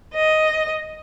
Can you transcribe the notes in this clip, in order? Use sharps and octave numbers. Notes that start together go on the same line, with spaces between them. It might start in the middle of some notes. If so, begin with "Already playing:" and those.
D#5